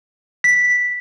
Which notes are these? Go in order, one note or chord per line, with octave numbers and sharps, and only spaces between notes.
B6